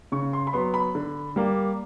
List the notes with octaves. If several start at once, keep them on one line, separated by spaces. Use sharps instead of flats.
C#3 C#6
C6
B5
F#3 B3 C6
B5
D3
G3 A#3